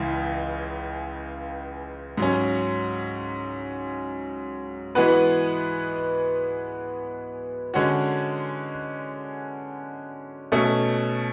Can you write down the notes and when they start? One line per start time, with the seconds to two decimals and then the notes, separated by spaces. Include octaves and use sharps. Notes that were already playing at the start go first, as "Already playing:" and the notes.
Already playing: C#2 C#3 E3 G#3
2.18 G#2 F#3 C#4
4.95 E3 G#3 B3 F#4 B4
7.74 D3 G#3 C#4 F#4
10.52 B2 A3 C#4